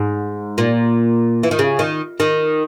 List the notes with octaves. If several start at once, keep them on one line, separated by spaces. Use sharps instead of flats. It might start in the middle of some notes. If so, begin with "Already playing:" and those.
Already playing: G#2
A#2
E3
D#3
C#3
D#3
D#3